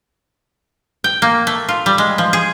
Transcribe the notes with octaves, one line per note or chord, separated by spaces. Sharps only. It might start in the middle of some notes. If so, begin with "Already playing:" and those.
G5
A#3
A3
F4
G3
G#3
F3
G#4